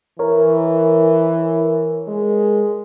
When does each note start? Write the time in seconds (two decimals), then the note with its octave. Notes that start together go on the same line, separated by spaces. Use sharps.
0.19 E3 A#4 C#5
2.08 G#3